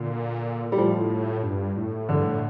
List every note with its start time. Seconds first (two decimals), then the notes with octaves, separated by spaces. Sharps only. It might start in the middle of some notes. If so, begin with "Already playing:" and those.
Already playing: A#2 D3
0.72 G3
0.78 A2 F3
1.43 G2
1.77 A2
2.08 G2 D3
2.25 A2